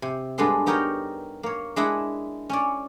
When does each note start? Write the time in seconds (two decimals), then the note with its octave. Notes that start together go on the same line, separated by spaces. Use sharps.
0.02 C3
0.38 G2 G#3 B3 D4 A4 C6
0.66 B3 D#4 G4 A#4 C#5 A#5
1.43 A#3 C#5
1.76 G#3 D4 E4 G#4 E5 F#5
2.50 C#4 C#5 D5